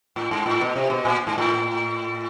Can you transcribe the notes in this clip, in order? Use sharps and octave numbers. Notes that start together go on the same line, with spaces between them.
A2
G#2
A2
B2
C3
B2
A#2
G#2
A2